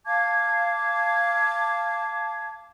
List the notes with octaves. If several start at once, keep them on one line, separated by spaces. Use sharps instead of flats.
F5 A5 D6 G#6